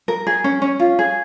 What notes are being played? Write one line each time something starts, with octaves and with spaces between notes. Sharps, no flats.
A#4
G#4
C#4
C#4
F4
G#4